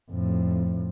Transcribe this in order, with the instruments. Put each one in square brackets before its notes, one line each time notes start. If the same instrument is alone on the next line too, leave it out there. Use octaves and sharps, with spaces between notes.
[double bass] F2 A2